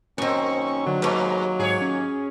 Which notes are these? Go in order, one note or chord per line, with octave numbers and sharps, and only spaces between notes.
F#2 D#3 A#3 C4 C#4 C#6
D3 F#3
D#2 G#2 G#3 A#3 B4
G#2 G#4 C#5
C#4